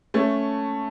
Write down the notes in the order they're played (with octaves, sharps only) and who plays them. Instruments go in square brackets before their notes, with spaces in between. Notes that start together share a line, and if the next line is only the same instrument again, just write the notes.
[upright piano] A3 C#4